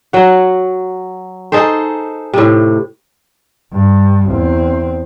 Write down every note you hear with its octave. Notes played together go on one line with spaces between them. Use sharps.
F#3 F#5
D#4 G#4 A4 C5
A2 C3
G2
E2 C4